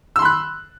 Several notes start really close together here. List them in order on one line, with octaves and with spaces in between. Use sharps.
E6 C6 B5 F#6